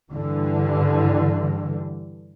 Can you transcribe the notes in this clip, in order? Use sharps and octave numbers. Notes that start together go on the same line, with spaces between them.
G2 D3 E3